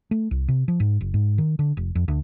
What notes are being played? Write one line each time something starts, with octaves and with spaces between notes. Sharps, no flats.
A3
C2
C3
F3
G#2
F#1
G#2
D#3
D3
F1
F2
D2